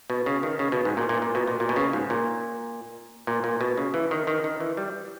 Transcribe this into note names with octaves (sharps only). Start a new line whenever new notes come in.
B2
C#3
D#3
C#3
B2
G#2
A#2
A#2
A#2
B2
A#2
A#2
B2
C#3
G#2
A#2
A#2
A#2
B2
C#3
E3
D#3
D#3
D#3
E3
G3